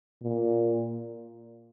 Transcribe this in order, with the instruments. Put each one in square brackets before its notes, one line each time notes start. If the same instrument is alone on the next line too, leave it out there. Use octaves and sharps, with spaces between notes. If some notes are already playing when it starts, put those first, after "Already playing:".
[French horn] A#2